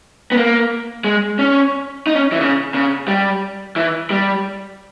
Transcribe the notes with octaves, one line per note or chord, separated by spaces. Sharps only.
B3
A#3
G#3
C#4
D#4
C#4
E3
C#3
C#3
G3
E3
G3